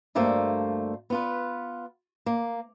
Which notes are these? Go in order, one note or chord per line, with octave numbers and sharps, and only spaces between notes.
D2 G2 A3 A#3 C5
B3 F4 B4
A#3